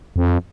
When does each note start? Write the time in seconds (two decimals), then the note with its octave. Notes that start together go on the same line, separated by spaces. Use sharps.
0.16 F2